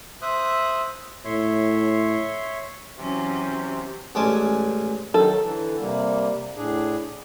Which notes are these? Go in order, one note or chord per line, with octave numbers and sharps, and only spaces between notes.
C5 E5 D#6 F#6
A2 C#5 E5 C6
C3 E3 F#3 C#4
A1 G#3 C#4 D5 G#5 A5
D#3 F#3 D#4 A4
D3 E3
C3 G3 A#3
A2 D4 G#4